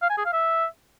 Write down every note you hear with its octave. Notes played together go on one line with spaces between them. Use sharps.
F5
G#5
G#4
F5
E5